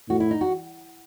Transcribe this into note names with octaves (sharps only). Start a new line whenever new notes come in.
A2 F#4
E4
D#4
F#4